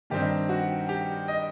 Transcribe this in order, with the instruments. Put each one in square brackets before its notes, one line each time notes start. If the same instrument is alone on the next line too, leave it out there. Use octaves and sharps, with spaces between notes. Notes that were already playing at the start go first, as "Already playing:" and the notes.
[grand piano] G2 D#3 G3 C4 D#4 G4
F#4
G4
D#5